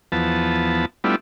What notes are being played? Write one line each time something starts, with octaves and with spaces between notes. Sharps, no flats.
E2 F3 B3 A5
G3 A3 B3 D4 E4 F4